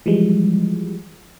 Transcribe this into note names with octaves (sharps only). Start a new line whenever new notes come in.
E3 F3 G3 G#3